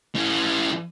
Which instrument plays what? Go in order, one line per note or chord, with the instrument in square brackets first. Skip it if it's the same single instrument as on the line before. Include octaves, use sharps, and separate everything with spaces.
[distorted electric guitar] E3 C#4